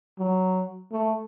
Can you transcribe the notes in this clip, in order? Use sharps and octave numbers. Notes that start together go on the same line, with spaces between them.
F#3
A3